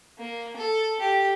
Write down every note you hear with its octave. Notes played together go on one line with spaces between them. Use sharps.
A#3
A4
G4